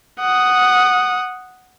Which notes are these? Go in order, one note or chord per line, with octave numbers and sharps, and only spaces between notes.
F#5 D#6